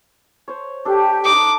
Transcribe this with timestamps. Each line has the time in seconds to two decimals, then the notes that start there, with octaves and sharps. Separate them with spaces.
0.48 C5 C#5
0.85 D4 G4 A4
1.25 D4 D#4 D#5 D6